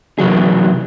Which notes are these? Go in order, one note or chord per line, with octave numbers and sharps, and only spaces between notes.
C3 E3 F#3 G#4